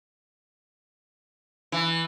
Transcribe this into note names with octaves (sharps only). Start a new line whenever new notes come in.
E3